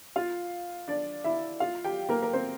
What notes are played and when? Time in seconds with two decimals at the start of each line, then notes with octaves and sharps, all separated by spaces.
0.16 F4 F5
0.88 D4 D5
1.24 E4 E5
1.60 F4 F5
1.85 G4 G5
2.09 A#3 A#4
2.22 A#4
2.33 C4 C5